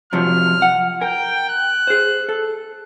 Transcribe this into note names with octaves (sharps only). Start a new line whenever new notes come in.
C3 F3 F#3 F6
F#5
A#4 G5
F#6
G#4 C5
A4